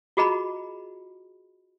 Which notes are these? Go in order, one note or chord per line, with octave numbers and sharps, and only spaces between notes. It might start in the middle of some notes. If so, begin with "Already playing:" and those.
F4 F#4 G#4 D#5 A#5 B5